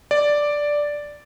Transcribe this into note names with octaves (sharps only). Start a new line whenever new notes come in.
D5